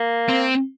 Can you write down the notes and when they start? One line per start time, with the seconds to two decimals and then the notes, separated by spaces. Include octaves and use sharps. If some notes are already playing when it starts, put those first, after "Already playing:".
Already playing: A#3
0.29 C4